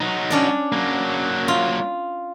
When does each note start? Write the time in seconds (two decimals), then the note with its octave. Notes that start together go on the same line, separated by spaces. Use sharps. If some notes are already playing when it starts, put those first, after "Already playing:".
0.01 F#3 D#4
0.30 C#4 D4 D5
0.72 F#3 A#3
1.48 F4